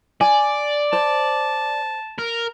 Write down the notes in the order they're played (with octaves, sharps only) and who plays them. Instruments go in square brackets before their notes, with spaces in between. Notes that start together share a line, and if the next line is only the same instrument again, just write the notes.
[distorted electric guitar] D5 [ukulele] G#5
[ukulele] C5 [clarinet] A5
[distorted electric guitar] A#4